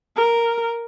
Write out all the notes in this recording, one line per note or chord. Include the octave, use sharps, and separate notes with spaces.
A#4